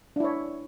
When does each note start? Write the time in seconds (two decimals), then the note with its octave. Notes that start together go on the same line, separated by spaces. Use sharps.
0.16 D4
0.20 E4
0.24 C#5